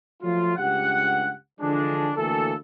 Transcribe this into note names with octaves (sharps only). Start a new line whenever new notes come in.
F3 F#3 A3 F4
C#2 G2 G4 F#5
D3 E3 F3 G#3 D4
D2 E3 A#3 A4